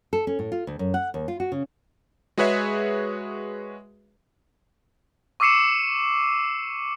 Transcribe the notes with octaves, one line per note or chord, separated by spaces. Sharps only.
A4
C#4
A2
F4
D2
F#2
F#5
D#2
F4
F#4
C#3
G#3 F#4 G#4 B4 C#5 E5
C#6 D6 E6 C7 C#7 E7